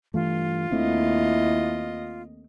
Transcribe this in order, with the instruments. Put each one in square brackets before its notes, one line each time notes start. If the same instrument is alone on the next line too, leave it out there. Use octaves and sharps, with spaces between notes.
[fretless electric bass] G2 E3 A3 [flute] F4
[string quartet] D#2 D#5 [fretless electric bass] A3 C4 D4 [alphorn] E4